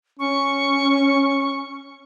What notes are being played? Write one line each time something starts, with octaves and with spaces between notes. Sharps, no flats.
C#4 C#6